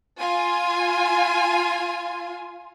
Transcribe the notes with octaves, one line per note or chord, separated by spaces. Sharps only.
F4 G#5